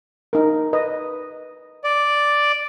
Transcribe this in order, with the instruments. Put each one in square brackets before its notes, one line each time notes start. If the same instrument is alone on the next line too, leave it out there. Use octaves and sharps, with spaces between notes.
[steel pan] D#4 A#4
B4 D#5
[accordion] D5